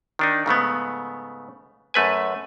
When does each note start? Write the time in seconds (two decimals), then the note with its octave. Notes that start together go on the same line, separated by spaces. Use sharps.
0.19 D#3 D4 D#4
0.46 G#2 C#3 A3 B3
1.94 F#2 A3 B4 G#5